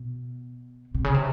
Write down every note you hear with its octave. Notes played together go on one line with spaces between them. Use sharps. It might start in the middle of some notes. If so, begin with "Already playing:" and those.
Already playing: B2
C3
C#3
C3